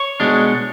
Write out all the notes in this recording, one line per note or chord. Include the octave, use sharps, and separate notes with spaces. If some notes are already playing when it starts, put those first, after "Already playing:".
Already playing: C#5
B2 G#3 D4